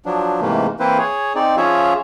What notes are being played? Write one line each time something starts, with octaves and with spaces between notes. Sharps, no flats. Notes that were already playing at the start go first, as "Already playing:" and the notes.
F3 F#3 D4
G#2 C3 E3 A3 A#3
E3 A#3 C4 E4 B4 C5
G#4 C#5
C4 D#4 D5
F3 C#4 F4 G#4 C#5 E5